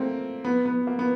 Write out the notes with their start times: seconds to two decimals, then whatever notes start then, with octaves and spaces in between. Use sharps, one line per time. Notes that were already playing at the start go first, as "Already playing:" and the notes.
Already playing: A3 A#3 C4
0.45 B3
0.66 B3
0.87 A#3
0.99 B3